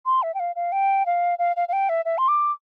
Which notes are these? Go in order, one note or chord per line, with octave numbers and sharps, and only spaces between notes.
C6
E5
G5
F5
F5
G5
F5
F5
F5
F5
G5
E5
E5
C6
D6